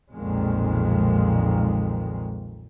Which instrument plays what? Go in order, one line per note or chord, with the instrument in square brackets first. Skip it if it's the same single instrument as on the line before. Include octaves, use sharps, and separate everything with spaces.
[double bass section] B1 F2 A#2 D#3 G#3